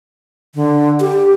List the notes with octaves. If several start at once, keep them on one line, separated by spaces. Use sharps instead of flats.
D3
G4